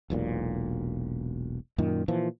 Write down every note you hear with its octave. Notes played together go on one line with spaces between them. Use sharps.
E1 B1 A#2
F#2 A#2 D#3
A#2 E3 F3